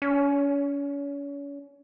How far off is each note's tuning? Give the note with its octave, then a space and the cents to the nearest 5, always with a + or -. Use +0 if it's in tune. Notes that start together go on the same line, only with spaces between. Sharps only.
C#4 +35